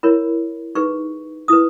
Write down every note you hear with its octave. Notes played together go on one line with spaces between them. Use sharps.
E4 A#4 C#5 B5
D#4 G#4 B4 C#6
E4 B4 D#6